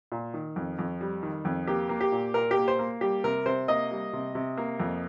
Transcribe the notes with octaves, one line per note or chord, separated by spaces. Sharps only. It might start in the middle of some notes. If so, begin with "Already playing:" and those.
A#2
D#3
F2
F2
G3
D#3
F2
A#3 G4
A#3
G4
A#2
A#2 A#4
G4
A#3
C5
A#3
G3 G4
C3 A#4
C3 C5
A#3 D#5
G3
C3
C3
A#3
F2